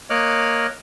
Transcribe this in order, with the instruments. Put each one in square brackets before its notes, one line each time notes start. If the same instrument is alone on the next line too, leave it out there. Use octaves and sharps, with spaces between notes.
[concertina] A#3 C#5 D#5 D6 F6 F#6